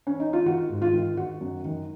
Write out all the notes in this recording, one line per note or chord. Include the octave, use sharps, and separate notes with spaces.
C#4
D#4
F4
D#3 F#4
G#2
F4
D#3
D#3 F#4
F#2
D#3